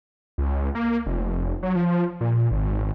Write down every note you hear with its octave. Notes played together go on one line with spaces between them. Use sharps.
C#2
A#3
F1
F#3
F3
A#2
G#1